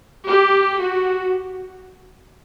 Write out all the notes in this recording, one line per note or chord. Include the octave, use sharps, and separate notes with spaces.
G4
F#4